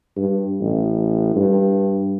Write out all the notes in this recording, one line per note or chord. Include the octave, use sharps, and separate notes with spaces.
G2
A1
G2